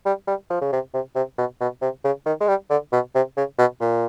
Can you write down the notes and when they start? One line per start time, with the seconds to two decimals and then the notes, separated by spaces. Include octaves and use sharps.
0.06 G3
0.27 G3
0.50 F3
0.61 C#3
0.72 C3
0.94 C3
1.15 C3
1.38 B2
1.61 B2
1.82 C3
2.04 C#3
2.26 D#3
2.41 G#3
2.48 G3
2.70 D3
2.93 B2
3.15 C3
3.37 C#3
3.58 B2
3.81 A#2